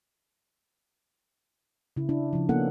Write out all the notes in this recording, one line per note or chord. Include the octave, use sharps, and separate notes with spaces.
C#3 E4
D4 E4
C#3 F3
A#3 B3 C#4 D#4 A4 F#5